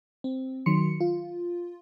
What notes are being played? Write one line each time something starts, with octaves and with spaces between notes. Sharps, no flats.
C4
D#3 F#3 C6 C#7
F4